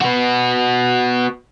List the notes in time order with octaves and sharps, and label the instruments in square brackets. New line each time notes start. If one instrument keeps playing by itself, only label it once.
[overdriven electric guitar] B3 F#4